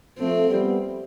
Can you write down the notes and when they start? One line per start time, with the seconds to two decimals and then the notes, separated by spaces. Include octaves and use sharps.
0.19 F3 A3 C4
0.48 G3 B3